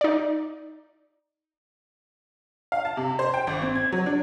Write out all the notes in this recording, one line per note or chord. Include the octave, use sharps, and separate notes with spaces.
D#4 D5
F5
A5
C3
C5
G5
G#1
C4
G#6
F#3
D4